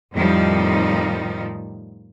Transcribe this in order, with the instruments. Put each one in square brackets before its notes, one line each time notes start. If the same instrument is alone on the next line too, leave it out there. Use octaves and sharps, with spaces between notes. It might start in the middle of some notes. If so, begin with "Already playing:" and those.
[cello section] F2 A2 D#3 F3 G3 D#4